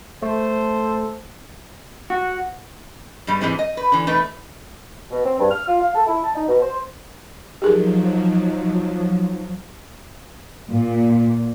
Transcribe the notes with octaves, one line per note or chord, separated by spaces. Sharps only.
A3 A4 C5
F#4
G2 B2 G3 G#3
G#2 C3 E3 G#3 C4
D#5
B4
D3 E3
E2 C3 A3 D#4 B4
B2
C4
G2
F6
F4
F5
A4
E4
A5
D#4
B2
C5
F3 F#3 D#4 G4 G#4 A#4
A#2